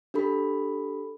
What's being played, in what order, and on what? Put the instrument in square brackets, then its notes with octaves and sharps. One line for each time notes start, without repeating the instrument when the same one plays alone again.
[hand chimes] D4 G4 A4 B5